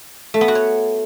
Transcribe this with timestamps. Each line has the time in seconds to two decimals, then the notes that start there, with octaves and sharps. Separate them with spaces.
0.34 A3
0.41 B3
0.48 F#4
0.55 C#5